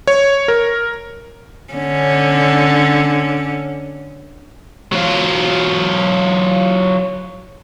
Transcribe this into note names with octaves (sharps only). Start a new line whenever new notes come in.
C#5
A#4
D3 C#4
F#3 F4